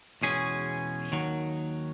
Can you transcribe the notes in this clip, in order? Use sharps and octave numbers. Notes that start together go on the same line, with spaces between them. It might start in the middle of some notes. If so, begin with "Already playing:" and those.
E2 B2 G#3 C#4 G#4
D#2 D#3 F#3